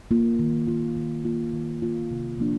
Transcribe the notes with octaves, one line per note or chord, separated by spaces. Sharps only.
A#3 F4
D#3
A#3 F4
D#3
A#3 F4
D#3
A#3 F4
C3
F3 A#3 D4